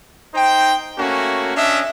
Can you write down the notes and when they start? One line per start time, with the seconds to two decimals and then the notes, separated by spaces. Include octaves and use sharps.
0.35 D#4 C5 G5
0.98 A3 A#3 C#4 F#4
1.55 C#4 D4 D#5 E5